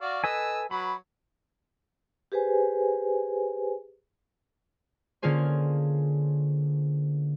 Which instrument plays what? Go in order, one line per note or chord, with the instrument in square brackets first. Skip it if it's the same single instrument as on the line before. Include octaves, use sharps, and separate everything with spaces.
[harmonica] F#4 D5 F5
[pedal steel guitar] A4 B4 G#5 [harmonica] D#5 E6
[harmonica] F#3 B4 [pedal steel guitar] B5
[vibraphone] G4 G#4 B4 C5 G#5
[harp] D3 A#3 C#4 F4 G#4 C5